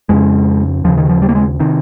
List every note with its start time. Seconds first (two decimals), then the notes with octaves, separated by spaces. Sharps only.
0.09 F2 C#3 G#3
0.84 D#2 F3
0.89 C#3
0.97 D#3
1.09 F3
1.22 G3
1.29 A#3
1.35 G#3
1.60 C3 D#3